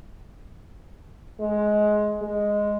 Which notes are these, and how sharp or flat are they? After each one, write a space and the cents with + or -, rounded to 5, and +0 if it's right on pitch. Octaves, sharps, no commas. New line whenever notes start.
G#3 +15
G#3 +0